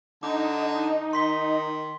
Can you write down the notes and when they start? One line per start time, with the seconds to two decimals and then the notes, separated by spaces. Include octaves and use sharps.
0.23 D3 D#4 D6
1.13 D#3 C6 B6 G7